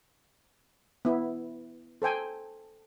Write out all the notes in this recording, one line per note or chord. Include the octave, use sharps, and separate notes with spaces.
B3 E4
A4 C5 G5 G#5